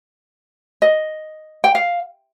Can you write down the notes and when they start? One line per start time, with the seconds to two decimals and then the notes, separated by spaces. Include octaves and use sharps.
0.82 D#5
1.64 G5
1.75 F5